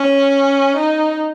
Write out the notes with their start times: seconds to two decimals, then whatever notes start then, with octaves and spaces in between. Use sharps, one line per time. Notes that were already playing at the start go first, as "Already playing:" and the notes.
Already playing: C#4
0.77 D#4